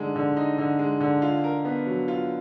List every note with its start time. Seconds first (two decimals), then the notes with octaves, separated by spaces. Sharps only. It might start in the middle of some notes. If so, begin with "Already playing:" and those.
Already playing: D3 G#3 D#4
0.16 D3
0.37 D#4
0.58 D3
0.79 G#3
1.00 D3
1.22 F4
1.44 A#4
1.65 B3
1.87 F#3
2.08 F4